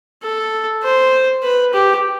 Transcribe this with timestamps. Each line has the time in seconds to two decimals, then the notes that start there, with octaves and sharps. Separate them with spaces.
0.23 A4
0.83 C5
1.43 B4
1.74 G4